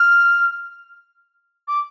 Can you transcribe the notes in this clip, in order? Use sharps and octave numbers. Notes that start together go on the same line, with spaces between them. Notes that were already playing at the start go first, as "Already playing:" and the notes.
Already playing: F6
D6